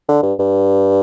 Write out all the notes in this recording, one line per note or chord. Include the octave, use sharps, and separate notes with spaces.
D3
G2
G2